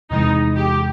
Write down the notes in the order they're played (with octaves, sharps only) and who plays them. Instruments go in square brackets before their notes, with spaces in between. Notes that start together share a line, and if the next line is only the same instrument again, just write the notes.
[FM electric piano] E2 C3 E3 G#3 [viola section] D#4
[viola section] G4